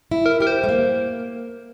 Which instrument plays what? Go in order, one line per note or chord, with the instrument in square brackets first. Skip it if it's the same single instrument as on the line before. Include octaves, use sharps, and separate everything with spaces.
[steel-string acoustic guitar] E4
[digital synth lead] A#4
[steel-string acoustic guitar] G4 [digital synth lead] A#4
[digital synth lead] C5
[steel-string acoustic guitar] A3
A#3